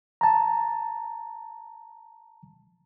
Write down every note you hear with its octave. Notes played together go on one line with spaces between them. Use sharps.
A5 A#5